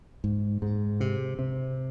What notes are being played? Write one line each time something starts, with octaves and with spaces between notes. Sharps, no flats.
G#2
G#2
C3
C3